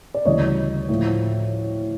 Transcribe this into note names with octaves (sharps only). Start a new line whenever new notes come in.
D5
D2 C#3 E3 G3 C#5 D#5
A2 F3